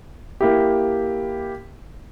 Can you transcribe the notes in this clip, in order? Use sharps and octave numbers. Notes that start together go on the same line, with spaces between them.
A#3 E4 G4